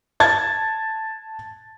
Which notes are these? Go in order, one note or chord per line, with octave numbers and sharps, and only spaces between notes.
A5 G#6 A6